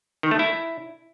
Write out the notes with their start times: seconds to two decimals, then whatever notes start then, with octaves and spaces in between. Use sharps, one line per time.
0.23 D#3
0.31 A3
0.39 E4